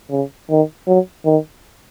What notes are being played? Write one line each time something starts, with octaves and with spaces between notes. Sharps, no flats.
C#3
D#3
F#3
D#3